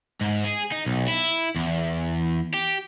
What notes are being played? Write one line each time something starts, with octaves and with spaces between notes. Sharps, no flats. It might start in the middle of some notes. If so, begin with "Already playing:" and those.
G#2
G#4
D#4
B1
E4
E2
G4